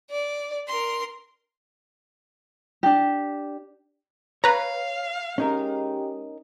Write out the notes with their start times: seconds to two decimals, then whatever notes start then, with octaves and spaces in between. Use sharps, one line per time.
0.11 D5
0.68 A#4 C6
2.83 D4 G4
4.44 B4 C#5 F5 A#5
5.38 G#3 C#4 D#4 G4 A#4